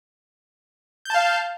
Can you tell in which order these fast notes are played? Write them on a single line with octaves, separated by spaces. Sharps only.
G6 A5 F5